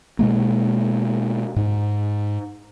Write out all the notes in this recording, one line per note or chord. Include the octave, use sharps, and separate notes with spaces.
B2 G#3 A#3
G#2